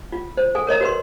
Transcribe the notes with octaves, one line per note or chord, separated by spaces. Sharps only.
F4
C5
A4 G#5
A#4 C#5 D#5 A#5
F#4 B4 C6